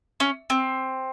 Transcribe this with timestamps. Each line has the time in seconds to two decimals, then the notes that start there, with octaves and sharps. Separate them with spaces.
0.20 C#4
0.50 C4